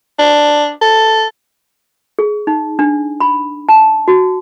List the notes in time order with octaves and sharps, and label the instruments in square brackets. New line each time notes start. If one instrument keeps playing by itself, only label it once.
[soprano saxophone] D4
A4
[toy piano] G#4
D#4
D4
B5
A5
F#4